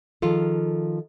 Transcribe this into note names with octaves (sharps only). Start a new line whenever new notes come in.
D#3 F3 F4 G#4 A4